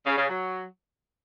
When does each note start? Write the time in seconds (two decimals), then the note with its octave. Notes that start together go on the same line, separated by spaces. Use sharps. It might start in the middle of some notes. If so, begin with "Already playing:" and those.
0.06 C#3
0.18 C#3
0.29 F#3